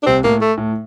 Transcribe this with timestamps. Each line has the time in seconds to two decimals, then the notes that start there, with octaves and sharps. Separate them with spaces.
0.03 D4
0.06 C2 C3 C4
0.24 A2 A#3
0.41 A3
0.57 A2